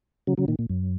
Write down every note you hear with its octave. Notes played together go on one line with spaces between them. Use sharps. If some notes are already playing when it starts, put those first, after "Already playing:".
C#3 F#3
C#3 F#3
A#2 D#3
A#2
F#2